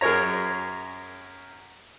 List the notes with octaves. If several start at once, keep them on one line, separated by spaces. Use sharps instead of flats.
F#2 G#4 A#4 C#5 A#5